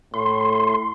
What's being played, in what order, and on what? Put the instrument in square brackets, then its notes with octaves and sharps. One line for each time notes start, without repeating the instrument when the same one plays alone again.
[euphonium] A2 [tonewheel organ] C6